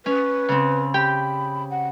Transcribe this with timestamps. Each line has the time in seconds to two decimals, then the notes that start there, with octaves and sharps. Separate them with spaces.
0.06 C#4 B4
0.49 C#3 C4
0.94 G4 G5 B5
1.71 F#5